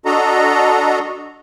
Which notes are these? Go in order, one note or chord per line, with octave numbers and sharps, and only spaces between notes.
D4 F#4 A4 D#5 A#5